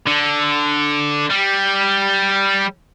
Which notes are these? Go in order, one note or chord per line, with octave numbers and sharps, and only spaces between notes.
D3
G3